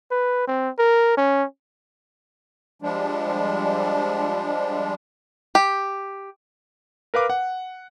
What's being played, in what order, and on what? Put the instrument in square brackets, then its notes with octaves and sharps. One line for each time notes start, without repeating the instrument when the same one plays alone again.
[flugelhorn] B4
C4
A#4
C#4
[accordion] F3 G3 G#3 D4
[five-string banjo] G4
[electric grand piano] A#4 B4 F5 D6
F#5